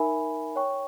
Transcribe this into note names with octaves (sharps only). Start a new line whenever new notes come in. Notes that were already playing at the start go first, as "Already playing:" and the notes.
Already playing: D#4 A#4 E5 G#5 B5
C#5 G5 C#6